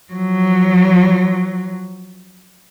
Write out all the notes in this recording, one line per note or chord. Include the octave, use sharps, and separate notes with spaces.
F3 F#3